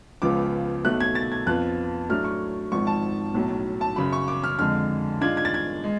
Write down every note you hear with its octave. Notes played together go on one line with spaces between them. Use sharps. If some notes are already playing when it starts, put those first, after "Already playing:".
C#2 C#3 F3 B3 F4 D6
B1 B2 A3 F#6
G#6
A6
G#6
F2 F3 B3 F4 F#6
A2 F#3 A3 D4 F6
C#6
G#1 G#2 F3 C#6
A5
B1 A2 F#3
A5
F#2 C#3 F#3 B5
C#6
D6
F6
F2 D3 G#3 F6
G#2 G#3 D4 F4 G#6
G#6
A6
G#6
G#3